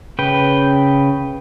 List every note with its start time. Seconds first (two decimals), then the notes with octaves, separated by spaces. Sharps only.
0.19 C#3 B4 G5